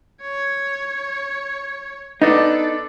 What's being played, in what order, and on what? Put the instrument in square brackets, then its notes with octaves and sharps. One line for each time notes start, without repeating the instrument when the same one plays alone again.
[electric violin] C#5
[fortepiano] B3 D4 [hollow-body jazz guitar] D#4 [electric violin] A4